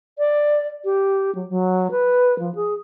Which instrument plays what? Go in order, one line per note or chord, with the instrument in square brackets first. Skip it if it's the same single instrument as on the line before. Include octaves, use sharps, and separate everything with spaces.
[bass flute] D5
G4
F#3
F#3
B4
F3
G#4